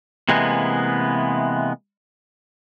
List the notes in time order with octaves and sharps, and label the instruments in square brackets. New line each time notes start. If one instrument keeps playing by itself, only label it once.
[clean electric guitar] C3 E3 G#3 A#3 B3